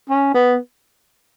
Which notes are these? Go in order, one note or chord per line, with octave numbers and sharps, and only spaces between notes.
C#4
B3